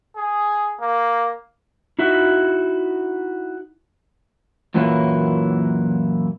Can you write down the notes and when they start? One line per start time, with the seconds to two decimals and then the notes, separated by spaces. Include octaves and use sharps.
0.17 G#4
0.80 A#3
1.99 D#4 E4 F#4 E5
4.74 F#2 A#2 E3 F#3 A#3 E4